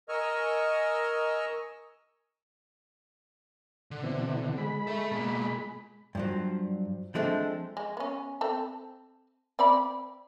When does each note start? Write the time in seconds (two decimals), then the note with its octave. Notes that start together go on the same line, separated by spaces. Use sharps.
0.09 A#4 D#5 G#5 C#6 E6 F6
3.91 D3
4.03 B2 E3 C4
4.58 G#3 B5
4.87 A4 E5
5.11 B2 A#3
6.15 G2 F3 F#3
7.15 F3 G#3 A3 C4 D4
7.77 G#3
7.97 B3 C#4
8.41 C4 A4
9.59 C4 D5 B5